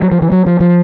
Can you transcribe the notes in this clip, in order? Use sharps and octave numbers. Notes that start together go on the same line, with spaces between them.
F#3
F3
E3
F#3
F3
F3